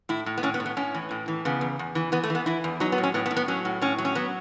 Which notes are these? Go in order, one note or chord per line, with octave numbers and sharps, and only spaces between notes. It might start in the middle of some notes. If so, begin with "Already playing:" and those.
A2 E4
A2
B3
A2 C#4
B3
A2
B3
A2 C#4
E3
A2
E3
C#3 B3
E2
E2
E3
E3 B3
A3
E3 B3
E3 E4
E2
F#3 D#4
B3
A2
C#4
A2 B3
B3
A2
B3
F#3 C#4
A2
A2 C#4
F#3
C#4
F#3 B3